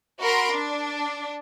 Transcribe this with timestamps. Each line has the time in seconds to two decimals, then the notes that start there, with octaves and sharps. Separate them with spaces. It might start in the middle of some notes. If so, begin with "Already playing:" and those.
0.21 F#4 A#4 B5 C6 A#6 D7
0.52 D4